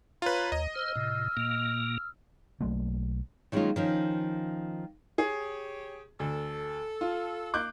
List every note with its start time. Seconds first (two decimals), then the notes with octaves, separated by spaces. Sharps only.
0.22 F4 B4 C#5 A#5 G#6
0.52 D#2 D#5
0.76 C5 E6 F6
0.96 A2 C3
1.37 A#2 A#3
2.61 B1 F#3 A3 A#3
3.52 D#3 F#3 G#3 A#3 C#4 F4
3.76 D#3 F3 C#4
5.18 G4 G#4 C#5
6.20 D2 A4
7.01 F4
7.54 A#3 D6 F#6 G6